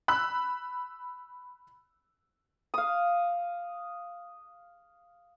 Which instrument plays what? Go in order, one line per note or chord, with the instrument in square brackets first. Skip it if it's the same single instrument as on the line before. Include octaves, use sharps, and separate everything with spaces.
[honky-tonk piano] B5 E6 F#6
[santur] F5 D#6